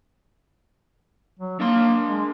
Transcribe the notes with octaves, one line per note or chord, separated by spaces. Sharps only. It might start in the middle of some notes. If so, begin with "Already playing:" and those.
F#3
A#3 D4 A#4 C6
G#3